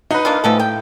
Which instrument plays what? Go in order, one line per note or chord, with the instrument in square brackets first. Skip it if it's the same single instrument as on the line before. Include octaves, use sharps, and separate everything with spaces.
[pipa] F#3 [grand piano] D#4 B4
[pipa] A#3 D4 F4
[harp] A2 [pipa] E3 F3 A4
[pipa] G5